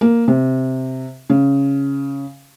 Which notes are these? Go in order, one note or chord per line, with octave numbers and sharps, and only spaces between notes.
A#3
C3
C#3